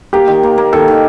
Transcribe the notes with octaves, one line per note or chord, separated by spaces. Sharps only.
A#3 G4
D#3
A#3
A#3
D#3 A4
D#3